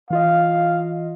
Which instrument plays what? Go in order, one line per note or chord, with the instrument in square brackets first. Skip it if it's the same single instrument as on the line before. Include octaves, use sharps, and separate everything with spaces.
[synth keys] E3 F4 D#5 [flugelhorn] F5